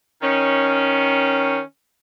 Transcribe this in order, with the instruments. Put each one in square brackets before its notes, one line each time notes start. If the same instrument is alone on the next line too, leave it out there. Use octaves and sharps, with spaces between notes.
[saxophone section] D#3 C#4